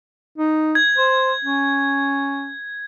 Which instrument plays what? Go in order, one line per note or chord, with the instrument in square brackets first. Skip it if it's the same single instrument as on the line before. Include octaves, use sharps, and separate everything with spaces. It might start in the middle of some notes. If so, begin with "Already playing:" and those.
[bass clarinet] D#4
[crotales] G#6
[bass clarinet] C5
C#4